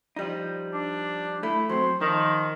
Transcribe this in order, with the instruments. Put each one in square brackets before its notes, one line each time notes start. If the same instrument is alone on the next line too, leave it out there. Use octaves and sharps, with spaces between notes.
[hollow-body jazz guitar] F3 G3 D#4
[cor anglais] D4
[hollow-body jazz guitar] A3 [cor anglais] E4
[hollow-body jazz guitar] F#3 C4 [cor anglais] C5
[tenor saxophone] D#3 [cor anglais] F3 [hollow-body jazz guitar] D#4